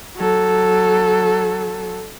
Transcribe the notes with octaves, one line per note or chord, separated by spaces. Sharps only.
F#3 A4